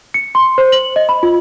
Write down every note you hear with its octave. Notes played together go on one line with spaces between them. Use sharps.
C#7
C6
C5
F#7
D#5
B5
F4